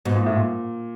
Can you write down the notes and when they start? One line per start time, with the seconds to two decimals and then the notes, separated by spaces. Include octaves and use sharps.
0.05 G#2 B2
0.15 A#2
0.26 A2
0.36 A#2